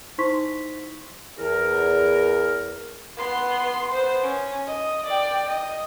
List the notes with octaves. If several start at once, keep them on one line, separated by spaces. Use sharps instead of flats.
D#4 E4 C5 C6 C#6 B6
E2 A#4
B3 C6
B3 C5
C#4
D#5
D5 G5
D#5